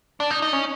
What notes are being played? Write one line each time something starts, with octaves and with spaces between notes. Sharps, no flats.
D4
D#4
D#4
C#4